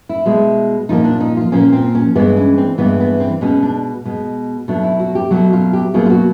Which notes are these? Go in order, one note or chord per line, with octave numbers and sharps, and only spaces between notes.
E4
B2 G#3
A#2 F3 A#3 D#4
D4
D#4
F4
A#2 F3 A#3 C#4
C4
C#4
G2 E3 G#3 B3
C#4
C4
G2 E3 G#3 B3
B3
C4
B2 G#3 C#4
D4
B2 G#3
B2 F#3 A3 D4
E4
F#4
G4
B2 F#3 A3 F#4
F4
G4
B2 F#3 A#3 G#4
F4
F#4